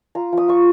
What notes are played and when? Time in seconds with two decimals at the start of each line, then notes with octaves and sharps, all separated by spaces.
0.15 F4 A#5
0.32 F3 D#6
0.48 F4 C#6